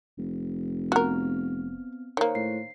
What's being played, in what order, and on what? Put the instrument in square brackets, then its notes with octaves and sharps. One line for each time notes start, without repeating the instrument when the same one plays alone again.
[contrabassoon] F1
[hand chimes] B3 C4 F6 [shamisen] F#4 A#4
[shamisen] D#3 A#3 [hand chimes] C5 C#5
[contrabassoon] A2 [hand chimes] C7